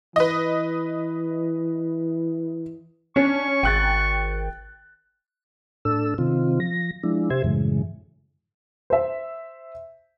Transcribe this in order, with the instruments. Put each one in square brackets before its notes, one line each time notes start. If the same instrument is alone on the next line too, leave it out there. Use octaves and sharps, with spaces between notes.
[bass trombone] E3 [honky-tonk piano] B4 D#5
[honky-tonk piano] C#4 [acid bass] D4 [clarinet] C#6
[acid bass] G#1 [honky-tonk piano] G5 F#6 A6
[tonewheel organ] A2 D4 A4 E6
C3 D#3 C4 F4
F3 A#6
F3 G#3 D4 E4
C3 G4 C5 E5 G#6
F#2 A2 C#3 E3 G#3
[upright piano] C5 E5